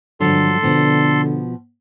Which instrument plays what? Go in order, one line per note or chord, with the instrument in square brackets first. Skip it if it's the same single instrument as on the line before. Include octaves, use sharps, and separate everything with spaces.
[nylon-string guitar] G2 F3 F#3 [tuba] D3 [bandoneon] A4 C6
[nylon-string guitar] B2 F3 B3 [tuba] D3